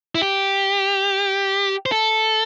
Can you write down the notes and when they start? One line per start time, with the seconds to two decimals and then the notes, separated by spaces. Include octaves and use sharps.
0.15 E4
0.21 G4
1.86 C5
1.92 A4